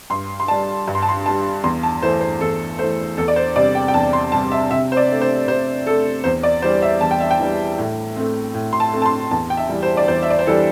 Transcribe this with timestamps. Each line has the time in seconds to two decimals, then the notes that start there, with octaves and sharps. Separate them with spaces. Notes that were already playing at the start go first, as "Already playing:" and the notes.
0.10 G2 C6
0.40 C6
0.48 G3 D4 A5
0.88 G2
0.95 C6
1.03 A5
1.09 C6
1.25 G3 D4 A5
1.64 E2 C6
1.83 A5
2.02 E3 A3 C5
2.21 C5
2.41 E2 A4
2.79 E3 A3 C5
3.18 E2 A4
3.28 D5
3.36 C5
3.56 C3 G3 D5
3.75 G5
3.88 G5
3.94 E2 A5
4.13 C6
4.32 C3 G3 A5
4.52 E5
4.71 C3 E5
4.92 C5
4.97 D5
5.09 A3 D4
5.21 C5
5.47 C3 C5
5.86 A3 D4 A4
6.24 E2 C5
6.43 D5
6.62 E3 G3 C5
6.82 E5
7.01 E2 A5
7.11 G5
7.21 E5
7.31 G5
7.39 E3 G3
7.78 A2
8.16 A3 C4
8.54 A2
8.73 C6
8.80 A5
8.93 A3 C4
9.02 A5
9.06 C6
9.31 E2 A5
9.50 G5
9.57 E5
9.69 E3 G3
9.83 C5
9.97 D5
10.08 E2 C5
10.23 E5
10.30 D5
10.39 C5
10.47 E3 G3 A4